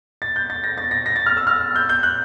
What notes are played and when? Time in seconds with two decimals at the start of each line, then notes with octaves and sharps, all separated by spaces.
0.22 A6
0.36 G6
0.50 A6
0.64 A#6
0.78 A6
0.91 A#6
1.06 A#6
1.16 A6
1.26 F6
1.37 E6
1.47 F6
1.76 G6
1.89 G6
2.03 F#6